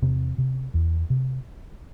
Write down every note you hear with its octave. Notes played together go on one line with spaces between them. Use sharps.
E2 C3 C4
C3
E2
C3